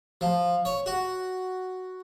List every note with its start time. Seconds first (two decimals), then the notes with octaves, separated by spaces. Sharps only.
0.21 F3
0.65 C#5
0.86 F#4